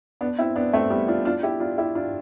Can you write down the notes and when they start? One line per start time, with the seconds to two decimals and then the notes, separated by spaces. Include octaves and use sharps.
0.21 B3 D4
0.39 C4 E4
0.56 B3 D4
0.73 A3 C4
0.90 G3 B3
1.08 D4 F4
1.25 D4 F4
1.43 E4 G4
1.60 D4 F4
1.78 E4 G4
1.95 D4 F4